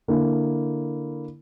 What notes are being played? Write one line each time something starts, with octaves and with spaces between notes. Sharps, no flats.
D3 A#3 E4